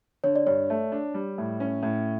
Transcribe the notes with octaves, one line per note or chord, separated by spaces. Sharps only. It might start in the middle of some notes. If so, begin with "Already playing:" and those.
D3 C#5
D5
G2 C#5
A3
D4
G3
A2
C#4
A2